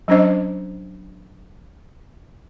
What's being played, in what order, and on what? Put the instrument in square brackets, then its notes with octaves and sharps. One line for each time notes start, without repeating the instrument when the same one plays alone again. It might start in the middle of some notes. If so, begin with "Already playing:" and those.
[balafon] F#3 C#4 D4 C5 D#5